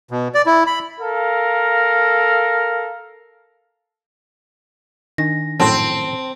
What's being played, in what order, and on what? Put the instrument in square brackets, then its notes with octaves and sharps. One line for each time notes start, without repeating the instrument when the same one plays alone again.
[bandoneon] B2
D5
E4
B5
[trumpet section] A4 A#4 F5
[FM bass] D#3 [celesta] D4 A#6
[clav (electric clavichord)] A#1 F#2 A2 [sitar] C4 [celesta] A5 C6